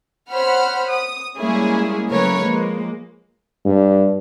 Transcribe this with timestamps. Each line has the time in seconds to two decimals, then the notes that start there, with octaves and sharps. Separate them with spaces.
0.31 C5 C#5 F#5 B5 F6
0.89 D#6
1.38 G3 G#3 A#3 C#4 E4 G#4
2.09 C#3 F#3 A3 A#4 B4 C#5
2.40 F3 G#3 A#3
3.65 G2